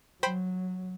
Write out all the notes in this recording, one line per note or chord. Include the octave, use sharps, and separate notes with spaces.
F#3 C5 G5 B5